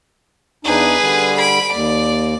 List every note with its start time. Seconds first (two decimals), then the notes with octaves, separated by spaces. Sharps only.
0.65 E2 D4 D#4 G#4 B4
1.01 D3 G3
1.38 B5 D7
1.73 D#2 D5